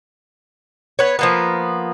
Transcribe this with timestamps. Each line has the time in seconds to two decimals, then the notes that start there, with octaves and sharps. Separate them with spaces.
0.99 B3 C#5
1.19 F3 A#3 B3